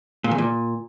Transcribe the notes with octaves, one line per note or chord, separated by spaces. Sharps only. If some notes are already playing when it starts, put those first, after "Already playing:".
A#2
E2
A#2